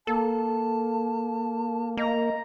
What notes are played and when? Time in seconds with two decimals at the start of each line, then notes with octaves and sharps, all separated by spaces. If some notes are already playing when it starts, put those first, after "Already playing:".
0.07 A#3 A4 A5
1.97 A#3 D#5 A#5